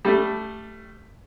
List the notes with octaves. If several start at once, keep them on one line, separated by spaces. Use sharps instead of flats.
G3 A3